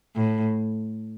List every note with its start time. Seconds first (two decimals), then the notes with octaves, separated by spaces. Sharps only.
0.16 A2